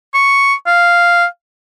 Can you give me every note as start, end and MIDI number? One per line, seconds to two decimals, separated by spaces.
0.14 0.54 85
0.67 1.25 77